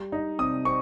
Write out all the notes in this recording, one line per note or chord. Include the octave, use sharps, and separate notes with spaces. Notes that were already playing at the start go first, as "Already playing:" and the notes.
Already playing: G3
D#4
C3 D#6
C4 C#6